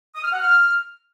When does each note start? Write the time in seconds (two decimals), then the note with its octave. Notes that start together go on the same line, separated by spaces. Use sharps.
0.15 D#6
0.24 F6
0.32 F#5
0.40 F6